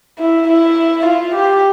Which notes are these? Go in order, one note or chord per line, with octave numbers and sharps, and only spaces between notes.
E4
E4
F4
G4